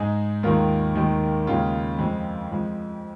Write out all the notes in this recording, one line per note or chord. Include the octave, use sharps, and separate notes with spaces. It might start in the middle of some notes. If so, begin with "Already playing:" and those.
Already playing: G#2 G#3 D#4 G#4
D#2 D#3 G#3 F4 A#4
D#2 D#3 G#3
D#2 C#3 G#3 F4
F2 F3 G#3
F2 F3 G#3